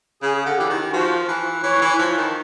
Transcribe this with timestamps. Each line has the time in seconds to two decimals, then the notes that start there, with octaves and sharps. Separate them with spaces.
0.22 C#3 G#4
0.46 D3
0.57 E3 G4
0.69 D#3
0.92 F3 F#4
1.28 E3
1.63 E3 C#5
1.82 E3
1.99 F3
2.17 D#3